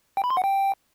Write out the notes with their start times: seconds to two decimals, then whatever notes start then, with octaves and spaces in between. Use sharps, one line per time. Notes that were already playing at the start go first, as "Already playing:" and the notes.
0.17 G5
0.24 B5
0.30 C6
0.37 F#5
0.44 G5